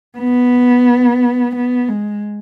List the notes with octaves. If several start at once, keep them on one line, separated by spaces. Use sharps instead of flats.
B3
B3
G#3